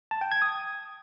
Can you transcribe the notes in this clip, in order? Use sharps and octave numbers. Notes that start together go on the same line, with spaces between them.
A5
G5
G#6
D#6